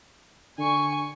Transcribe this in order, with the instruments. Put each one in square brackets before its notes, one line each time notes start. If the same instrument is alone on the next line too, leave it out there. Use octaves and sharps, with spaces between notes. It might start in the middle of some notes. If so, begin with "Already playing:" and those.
[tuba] D3 [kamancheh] G#5 C#6